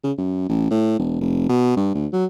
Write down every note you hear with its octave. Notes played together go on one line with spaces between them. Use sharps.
C#3
F#2
A1
A2
E1
F1
B2
G2
D2
F#3